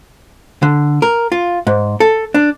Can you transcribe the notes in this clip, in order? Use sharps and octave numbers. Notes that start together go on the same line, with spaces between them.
D3
A#4
F4
G#2
A4
D4